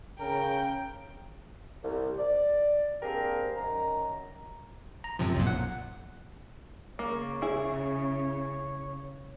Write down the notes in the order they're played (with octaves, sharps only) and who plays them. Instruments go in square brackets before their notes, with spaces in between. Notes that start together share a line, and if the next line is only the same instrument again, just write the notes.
[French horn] C#3 [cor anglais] A#4 [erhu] G5
[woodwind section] C2
D5
A#3 C4 D4 G4 G#4 A#4
F#2 D#3 A#5
[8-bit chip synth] A#5
F#2 C3 F3
B1 F#2 A#2
F#5
[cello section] C#3 [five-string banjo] A#3 [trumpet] C#5
[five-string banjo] E4 G#4